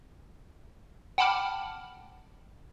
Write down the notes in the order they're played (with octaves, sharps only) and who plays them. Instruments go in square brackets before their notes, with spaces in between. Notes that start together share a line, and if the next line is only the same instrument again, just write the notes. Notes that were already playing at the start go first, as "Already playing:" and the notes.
[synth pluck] F#5 G5 A5 B5 D6 F6